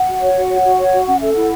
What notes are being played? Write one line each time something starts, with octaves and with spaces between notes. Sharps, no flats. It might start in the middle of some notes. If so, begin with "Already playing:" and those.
Already playing: F#5
F#4
C#5
F#4
C#5
F#4
C#5
F#4
C#4 F#5
A4 E5
E4 F#5